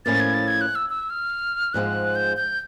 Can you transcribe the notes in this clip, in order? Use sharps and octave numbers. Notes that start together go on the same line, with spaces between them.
A2 F3 A#3 C#4 E4 A6
G#6
A6
G#6
F#6
E6
E6
F6
G#2 F3 G#3 C4 F#6
G6
G6